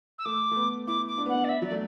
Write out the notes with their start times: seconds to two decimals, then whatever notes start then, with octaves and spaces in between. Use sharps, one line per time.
0.18 E6
0.25 A3 D6
0.51 A3
0.56 B3
0.87 E4 D6
1.08 D6
1.18 D4
1.26 B3 F#5
1.34 D4
1.44 D5
1.49 E5
1.62 F#3 D5
1.71 A3